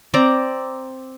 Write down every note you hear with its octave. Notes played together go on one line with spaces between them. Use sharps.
C4 D5 A#5